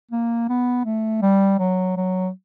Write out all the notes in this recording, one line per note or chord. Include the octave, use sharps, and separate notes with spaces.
A#3
B3
A3
G3
F#3
F#3